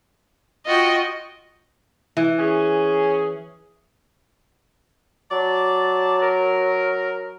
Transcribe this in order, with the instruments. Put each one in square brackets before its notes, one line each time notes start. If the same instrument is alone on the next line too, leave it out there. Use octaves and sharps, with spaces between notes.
[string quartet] F4 F#4 G5 [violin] D#5
[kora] E3
[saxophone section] C#4 G#4
[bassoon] F#3 [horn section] D5 A5
[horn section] A#4